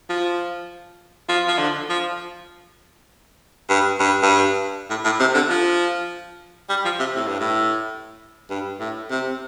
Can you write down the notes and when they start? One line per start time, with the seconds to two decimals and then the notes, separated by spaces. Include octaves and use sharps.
0.10 F3
1.29 F3
1.48 F3
1.59 D3
1.89 F3
3.70 G2
4.00 G2
4.23 G2
4.90 A2
5.05 A2
5.20 C3
5.35 D3
5.50 F3
6.70 G3
6.85 F3
6.99 C3
7.16 A2
7.28 G2
7.40 A2
8.50 G2
8.80 A2
9.10 C3